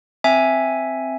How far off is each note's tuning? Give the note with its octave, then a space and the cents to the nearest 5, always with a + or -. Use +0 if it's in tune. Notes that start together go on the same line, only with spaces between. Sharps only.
C4 +0 E5 +0 G#5 +5